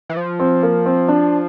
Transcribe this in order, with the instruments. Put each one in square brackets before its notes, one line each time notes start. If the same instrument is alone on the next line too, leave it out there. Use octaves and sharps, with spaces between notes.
[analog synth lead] E3
F3
[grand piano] C4
A#3
C4
D4